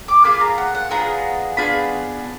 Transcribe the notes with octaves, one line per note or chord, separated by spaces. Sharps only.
D6
A#3 F4 G#4 B5
A#5
F#5
F#5
B3 D4 F4 G#4 A#5
B3 D4 F4 G#4 B5